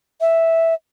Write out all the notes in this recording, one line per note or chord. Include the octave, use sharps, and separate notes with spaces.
E5